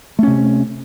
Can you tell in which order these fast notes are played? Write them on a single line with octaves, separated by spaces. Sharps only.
A3 C#4 C3